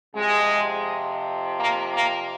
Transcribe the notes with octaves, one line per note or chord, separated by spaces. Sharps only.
F2 C3 F3 G#3
A#3
A#3